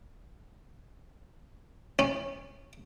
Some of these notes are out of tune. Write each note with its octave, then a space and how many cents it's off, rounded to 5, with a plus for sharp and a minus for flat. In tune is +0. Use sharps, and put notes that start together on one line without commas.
C#4 -20